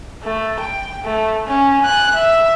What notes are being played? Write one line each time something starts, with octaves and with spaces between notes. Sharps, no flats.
A3
G5
A3
C#4
G#5 F#6
E5